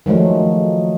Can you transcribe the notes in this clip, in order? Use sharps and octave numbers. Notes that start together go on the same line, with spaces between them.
D#3 F3 F#3 G#3 A3